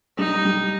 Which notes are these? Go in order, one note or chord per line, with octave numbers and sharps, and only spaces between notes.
G3 D#4
G3